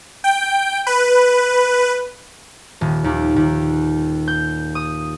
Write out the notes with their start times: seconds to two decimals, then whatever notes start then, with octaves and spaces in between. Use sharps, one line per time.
0.24 G5
0.87 B4
2.81 D#1
3.04 D#2
3.36 D#2
4.28 G6
4.75 D#6